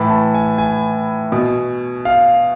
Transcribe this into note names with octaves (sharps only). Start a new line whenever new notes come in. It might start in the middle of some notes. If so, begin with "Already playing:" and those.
Already playing: A2 E3 B5
A5
G#5
G#5
B2
F5